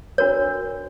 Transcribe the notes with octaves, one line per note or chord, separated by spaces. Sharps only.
D4 F#4 A#4 C#5